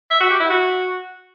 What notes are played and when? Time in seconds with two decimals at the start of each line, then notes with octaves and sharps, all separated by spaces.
0.11 E5
0.21 F#4
0.30 G4
0.40 E4
0.50 F#4